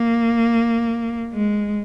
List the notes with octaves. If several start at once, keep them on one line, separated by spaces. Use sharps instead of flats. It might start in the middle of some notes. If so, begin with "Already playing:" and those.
Already playing: A#3
G#3